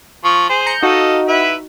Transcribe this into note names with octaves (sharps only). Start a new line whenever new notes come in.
F3 C#6
G#4 C5
A#5 G6 C#7
D#4 F#4 A4 D#5 F5
E4 B4 E5